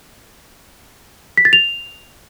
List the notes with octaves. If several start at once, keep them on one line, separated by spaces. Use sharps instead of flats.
B6
A6
F7